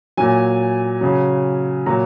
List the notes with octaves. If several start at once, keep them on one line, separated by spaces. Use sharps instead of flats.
A#2 F#3 G#5
C#3 F#3
A#2 F#3 A#5